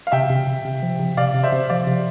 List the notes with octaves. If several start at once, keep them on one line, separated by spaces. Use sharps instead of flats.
F5
C3 E5 G5
C3
C3
C3
F3
C3
C3 D5 F5
C3
C5 E5
C3
F3 D5 F5
C3